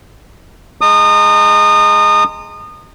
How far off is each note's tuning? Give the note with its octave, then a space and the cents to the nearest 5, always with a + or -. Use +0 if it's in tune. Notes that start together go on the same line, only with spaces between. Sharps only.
G#3 +0 A#5 -40 D#6 -25